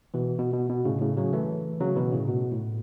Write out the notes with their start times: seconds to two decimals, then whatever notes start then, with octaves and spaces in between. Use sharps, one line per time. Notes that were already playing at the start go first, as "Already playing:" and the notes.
0.14 B2 E3
0.38 B2
0.53 B2
0.69 B2
0.85 A2 C#3
1.01 A2 C#3
1.17 C#3 F#3
1.33 E3 A3
1.80 C#3 F#3
1.96 B2 E3
2.12 A2 C#3
2.28 B2
2.52 A2